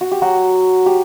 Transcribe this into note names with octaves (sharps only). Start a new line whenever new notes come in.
F#4
G4
F#3 F#4
G4